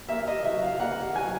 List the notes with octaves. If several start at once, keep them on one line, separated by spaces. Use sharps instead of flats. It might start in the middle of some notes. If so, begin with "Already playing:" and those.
A#3 E5
D#5
F#3 E5
F5
A#3 F#5
F#3 G#5